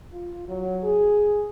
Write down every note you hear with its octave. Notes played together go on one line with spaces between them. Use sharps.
F4
F#3
G#4